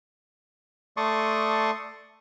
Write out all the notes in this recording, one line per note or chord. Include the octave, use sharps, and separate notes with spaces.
A3 D5 A5 C6 C#6 D#6